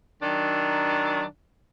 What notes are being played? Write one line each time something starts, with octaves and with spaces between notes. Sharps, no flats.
D#3 F#3 D4